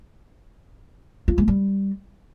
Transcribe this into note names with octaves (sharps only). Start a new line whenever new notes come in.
F4
G#3
G3